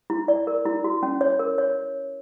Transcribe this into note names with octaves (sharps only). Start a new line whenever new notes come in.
E4
D5
A#4
E4
F#4
C#4
C#5
A#4
C#5